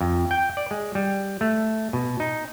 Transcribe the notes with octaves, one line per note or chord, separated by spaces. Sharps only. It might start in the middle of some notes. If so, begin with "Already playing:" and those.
F2
G5
D5
G#3
G3
A3
B2
D#4